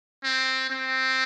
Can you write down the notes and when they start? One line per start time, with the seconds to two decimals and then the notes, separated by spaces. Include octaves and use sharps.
0.24 C4
0.70 C4